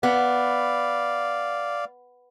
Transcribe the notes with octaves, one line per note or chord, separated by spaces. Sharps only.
B3 D5 F5